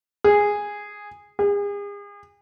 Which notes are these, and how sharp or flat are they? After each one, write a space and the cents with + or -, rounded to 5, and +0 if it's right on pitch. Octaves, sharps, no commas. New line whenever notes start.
G#4 -10
G#4 -40